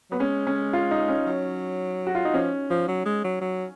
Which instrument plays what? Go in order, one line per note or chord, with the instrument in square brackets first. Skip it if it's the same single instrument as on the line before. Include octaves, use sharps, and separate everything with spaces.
[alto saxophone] F#3 [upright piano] B3
[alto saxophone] G#3 [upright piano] C#4
[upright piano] C#4
F4
D#4
C#4
[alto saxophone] F#3
[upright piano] F#4
F4
D#4
[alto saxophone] F3 [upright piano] C#4
[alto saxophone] F3
F#3
G#3
F#3
F#3